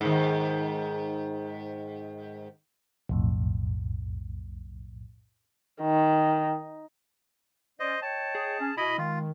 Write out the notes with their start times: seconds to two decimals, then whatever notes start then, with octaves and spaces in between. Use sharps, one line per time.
0.01 G#2 D#3
3.09 B1 F2 A2
5.82 D#3
7.80 C#4 C5 D5 D#5
8.02 C#5 D#5 G5 A5
8.35 G#4
8.59 C#4
8.77 B2 E4 D#5 B5
8.98 D#3 G#3 F4